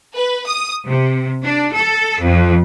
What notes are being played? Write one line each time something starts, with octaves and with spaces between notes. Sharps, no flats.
B4
D#6
C3
D4
A4
F2